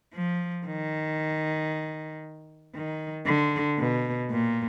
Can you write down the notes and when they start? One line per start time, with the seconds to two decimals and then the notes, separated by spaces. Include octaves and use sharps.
0.14 F3
0.67 D#3
2.74 D#3
3.27 D3
3.79 B2
4.31 A#2